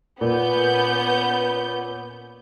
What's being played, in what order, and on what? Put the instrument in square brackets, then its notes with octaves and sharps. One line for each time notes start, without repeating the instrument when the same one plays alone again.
[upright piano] A#2 [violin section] B3 C#4 G6